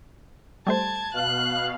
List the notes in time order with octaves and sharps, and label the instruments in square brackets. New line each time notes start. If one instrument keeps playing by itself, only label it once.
[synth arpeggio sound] G3 A3 C5 [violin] A5 G#6
[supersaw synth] B2 F5 [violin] F#6